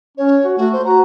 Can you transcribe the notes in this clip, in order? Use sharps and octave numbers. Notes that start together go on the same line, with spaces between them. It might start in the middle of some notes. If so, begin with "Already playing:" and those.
C#4 C#5
F#4
A3 F#4
C5
F#4 A#5